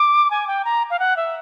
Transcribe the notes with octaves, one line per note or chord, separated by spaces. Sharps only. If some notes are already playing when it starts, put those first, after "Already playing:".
Already playing: D6
G#5
G5
A#5
F5
F#5
E5